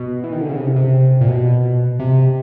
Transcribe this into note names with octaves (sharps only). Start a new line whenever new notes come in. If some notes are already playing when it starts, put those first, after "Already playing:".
Already playing: B2
E3
D#3
D3
C#3
C3
C3
A#2
B2
C3